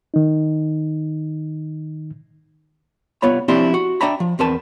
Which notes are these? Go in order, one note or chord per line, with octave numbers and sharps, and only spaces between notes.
D#3 D#4
C2 B3 F4 C#5 B5
F3 C4 D4 E4 G4
F#4
D4 E5 G5 A#5 B5
F3
E2 C4 A#4 B4 A5